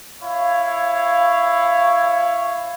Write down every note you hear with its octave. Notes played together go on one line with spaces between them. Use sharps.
E4 C#5 F5